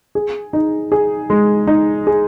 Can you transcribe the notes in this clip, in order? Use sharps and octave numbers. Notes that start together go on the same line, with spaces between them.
G#4
D#4
G#4
G#3
D#4
G#4